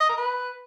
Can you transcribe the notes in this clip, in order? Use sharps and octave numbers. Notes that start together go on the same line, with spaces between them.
D#5
A#4
B4